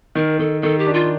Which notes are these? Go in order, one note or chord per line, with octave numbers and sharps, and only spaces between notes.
D#3 A#4
D#3 A4
D#3 A4
G4
D4
F4